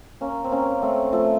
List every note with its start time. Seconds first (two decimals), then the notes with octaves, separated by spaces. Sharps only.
0.21 A#3 C#4
0.44 C4
0.51 A#3 C#4
0.82 A3 C4
1.13 F3 A3